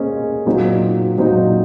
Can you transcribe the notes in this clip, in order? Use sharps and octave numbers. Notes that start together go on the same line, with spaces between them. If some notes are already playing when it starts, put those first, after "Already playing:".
Already playing: A#3 C#4 G#4 C5 D#5
A#2 F#3 C4 D#4
A#2 F#3 C4 D#4